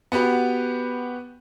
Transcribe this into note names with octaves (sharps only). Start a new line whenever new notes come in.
B3 F#4 G4 B4